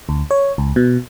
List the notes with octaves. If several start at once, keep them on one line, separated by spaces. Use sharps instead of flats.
D2
C#5
C#2
B2